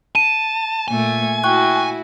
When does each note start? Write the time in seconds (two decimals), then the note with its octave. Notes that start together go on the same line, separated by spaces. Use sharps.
0.15 A5 D#7
0.88 A#2 A3 G#5
1.44 E4 F#4 G5 C#6 F#6